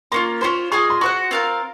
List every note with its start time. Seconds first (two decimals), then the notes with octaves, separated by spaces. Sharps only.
0.12 A#3 C#4 F4 C6
0.41 C#4 F4 G#4 C5 C6
0.72 F4 G#4 D#5 G#5 C#6
0.90 C6
1.01 F#4 C5 F#5 C#6
1.31 C4 F4 A#4 F5